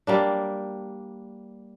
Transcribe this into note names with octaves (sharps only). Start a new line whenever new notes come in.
G3 A#3 D4